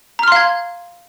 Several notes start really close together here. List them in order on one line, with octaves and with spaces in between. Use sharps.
A#5 F6 C6 F5 G#6